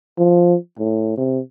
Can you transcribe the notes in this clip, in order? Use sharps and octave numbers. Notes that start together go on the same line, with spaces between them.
F3
A2
C3